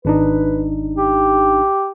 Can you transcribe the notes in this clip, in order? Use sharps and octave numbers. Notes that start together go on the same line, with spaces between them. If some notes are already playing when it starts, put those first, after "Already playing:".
G#1 D4 D#4 B4
G4